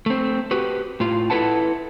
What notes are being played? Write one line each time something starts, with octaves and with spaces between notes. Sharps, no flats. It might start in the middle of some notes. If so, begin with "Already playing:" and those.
A3 C4
F#4 G4 B4
A2 F4
E4 F#4 A4 B4 F#5 A5